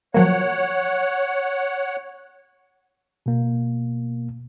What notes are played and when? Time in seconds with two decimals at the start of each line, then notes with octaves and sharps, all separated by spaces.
0.14 F3 F#3 A#3 C#5 F#5
3.26 B2 A#3